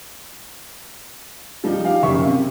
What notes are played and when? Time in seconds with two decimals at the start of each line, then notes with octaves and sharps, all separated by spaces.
1.64 F3 G3 D#4
1.84 D#4 G4 F5
2.03 F#1 C#3 E5 C#6
2.26 C3